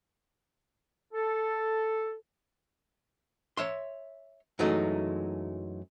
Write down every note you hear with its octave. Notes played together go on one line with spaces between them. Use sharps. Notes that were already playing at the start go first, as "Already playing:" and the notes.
A4
C#5 E5 C6
F#2 E3 F#3 G#3 A3 D#4